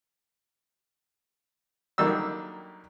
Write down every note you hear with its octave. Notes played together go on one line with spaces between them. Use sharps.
F#2 D3 D#3 G3 A#3 E6